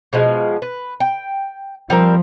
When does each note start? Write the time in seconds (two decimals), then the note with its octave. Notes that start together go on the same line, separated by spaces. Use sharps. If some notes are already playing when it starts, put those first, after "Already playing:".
0.13 B2 F3 G#3
0.62 B4
1.00 G5
1.90 F3 G3 C4 A#4